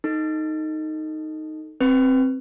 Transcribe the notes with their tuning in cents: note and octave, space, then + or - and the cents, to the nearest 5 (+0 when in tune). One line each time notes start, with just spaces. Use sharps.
D#4 +0 A4 +0
C4 +5 B4 +0